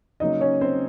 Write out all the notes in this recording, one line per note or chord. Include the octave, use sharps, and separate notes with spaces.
C#3 F#3 A#3 D#4 D#5
C#4 C#5
C4 C5